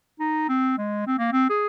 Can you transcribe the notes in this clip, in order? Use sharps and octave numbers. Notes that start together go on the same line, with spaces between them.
D#4
C4
G#3
C4
A#3
C4
G#4